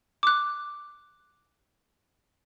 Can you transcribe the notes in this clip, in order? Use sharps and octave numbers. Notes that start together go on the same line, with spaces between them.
D6 F#6